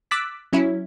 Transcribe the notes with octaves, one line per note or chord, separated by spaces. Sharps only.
D6 E6 F#6 A6 B6
F#3 C#4 E4